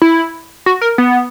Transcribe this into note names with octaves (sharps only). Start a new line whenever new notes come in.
E4
F#4
A#4
B3